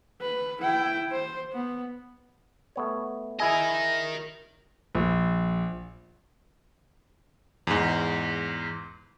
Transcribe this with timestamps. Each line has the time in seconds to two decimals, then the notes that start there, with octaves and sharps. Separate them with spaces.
0.21 B4
0.62 E4 G5
1.12 C5
1.53 B3
2.76 A3 B3 C#5
3.40 E4 G#4 A#4 D#5 G#5
4.95 A#1
7.67 E2 G#2